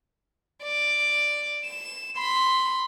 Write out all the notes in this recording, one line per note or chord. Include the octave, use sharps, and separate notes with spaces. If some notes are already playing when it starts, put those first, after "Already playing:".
D5
E7
B5 C6